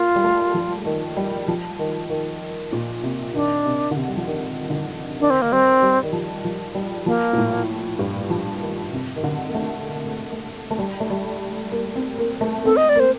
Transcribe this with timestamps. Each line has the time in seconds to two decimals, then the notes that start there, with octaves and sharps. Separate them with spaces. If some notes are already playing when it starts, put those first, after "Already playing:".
Already playing: A#3 F4
0.16 G3
0.24 A3
0.54 F3
0.85 D#3
1.17 G3
1.48 F3
1.79 D#3
2.10 D#3
2.73 A#2
3.03 C3
3.34 D#3 D4
3.65 C3
3.91 D3
3.96 C3
4.08 G3
4.17 F3
4.27 D#3
4.70 D3
4.73 D#3
5.20 D#3 D4
5.30 C4
5.42 A#3
5.52 G3 C4
5.82 G3
6.03 D#3
6.13 F3
6.45 F3
6.75 G3
7.06 F3 A#3
7.33 A#2
7.38 A2
7.99 G2
8.30 F3
8.61 D#3
8.93 C3
9.16 D#3
9.23 D3
9.48 A#3
9.54 A3
10.32 A3
10.71 A3
10.79 G3
11.00 A3
11.10 G3
11.72 A#3
11.95 C4
12.18 A#3
12.41 A3
12.65 C4 A4
12.77 D#5
12.89 D5
12.95 A#3 C5